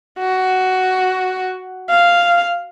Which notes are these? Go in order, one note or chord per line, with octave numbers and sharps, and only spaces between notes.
F#4
F5